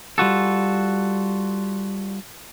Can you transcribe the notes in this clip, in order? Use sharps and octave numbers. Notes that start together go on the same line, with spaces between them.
G3 F4 F#4 A4